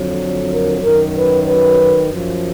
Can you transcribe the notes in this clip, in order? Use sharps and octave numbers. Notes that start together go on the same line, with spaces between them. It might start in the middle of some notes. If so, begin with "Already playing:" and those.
Already playing: F2 D3 F#3
A#4
F#2 D#3 F#3 A#4
B4
B4
F#2 F3